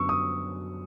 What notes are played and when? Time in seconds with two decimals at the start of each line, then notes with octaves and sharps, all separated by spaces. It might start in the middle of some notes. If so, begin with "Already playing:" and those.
Already playing: F#2 D3 F#3 B3 C#6 E6
0.09 D#6